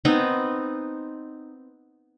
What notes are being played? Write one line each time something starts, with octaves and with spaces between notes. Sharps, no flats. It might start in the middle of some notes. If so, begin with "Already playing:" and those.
B3 C4 D#4